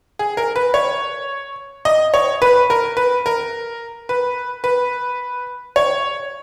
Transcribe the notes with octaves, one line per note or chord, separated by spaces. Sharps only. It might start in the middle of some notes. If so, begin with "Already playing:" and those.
G#4
A#4
B4
C#5
D#5
C#5
B4
A#4
B4
A#4
B4
B4
C#5